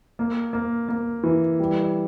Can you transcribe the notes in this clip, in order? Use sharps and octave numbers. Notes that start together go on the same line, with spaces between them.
A#3
A#3
A#3
E3
G3